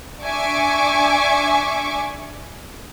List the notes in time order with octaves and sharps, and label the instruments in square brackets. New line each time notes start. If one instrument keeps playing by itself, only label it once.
[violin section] D4 E5 G#5 C#6 D6